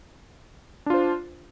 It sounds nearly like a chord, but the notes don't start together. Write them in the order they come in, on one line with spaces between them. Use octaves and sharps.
D4 F4 C5